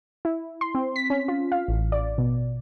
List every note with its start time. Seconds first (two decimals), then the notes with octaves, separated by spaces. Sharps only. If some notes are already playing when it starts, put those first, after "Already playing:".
0.25 E4
0.61 C6
0.75 C4
0.96 B6
1.10 C#4
1.28 F4
1.52 F5
1.68 A1
1.92 D5
2.18 B2